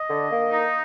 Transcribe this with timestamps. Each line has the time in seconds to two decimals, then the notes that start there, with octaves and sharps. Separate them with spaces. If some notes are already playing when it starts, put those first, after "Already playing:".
Already playing: D#5
0.08 D3
0.30 A#3
0.50 D#4